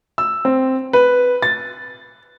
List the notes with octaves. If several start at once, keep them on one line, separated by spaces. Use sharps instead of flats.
E6
C4
B4
A6